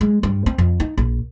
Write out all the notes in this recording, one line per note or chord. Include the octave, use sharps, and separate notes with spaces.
G#3
G2
C4
F2
D#4
A#1